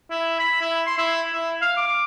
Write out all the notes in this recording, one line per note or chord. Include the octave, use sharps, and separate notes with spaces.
E4
B5
E4
C6
E4
E4
F5
D6